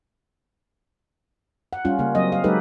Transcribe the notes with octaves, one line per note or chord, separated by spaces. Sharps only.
F#5
G3 C#4 F4
C#3 A#3
F#3 C4 D#5
F5
F#3 G#3 D#4 G4 A4 B4